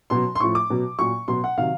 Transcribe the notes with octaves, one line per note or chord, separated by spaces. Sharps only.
B2 F#3 C6
C6
A2 F3 C#6
D6
B2 F#3
A#2 F#3 C#6
B2 F#3 C6
F#5
C3 D#3 F#3 F5